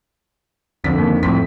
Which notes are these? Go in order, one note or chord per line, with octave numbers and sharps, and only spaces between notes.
F2 D3 B6
D#2
F2 A2 B6